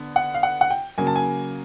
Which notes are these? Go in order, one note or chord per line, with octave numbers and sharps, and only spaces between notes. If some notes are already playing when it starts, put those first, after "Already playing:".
Already playing: D3 B3
F#5
F5
F#5
F#5
G5
C#3 F#3 A#3 G#5
A5
G#5